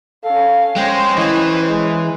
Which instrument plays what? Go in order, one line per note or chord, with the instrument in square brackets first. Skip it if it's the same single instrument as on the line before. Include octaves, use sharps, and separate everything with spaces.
[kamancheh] C#4 F5 [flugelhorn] A4
[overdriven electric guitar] G#3 [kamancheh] C#4 C5 [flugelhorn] G5
[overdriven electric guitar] E3 [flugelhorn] D#5
[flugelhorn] G#3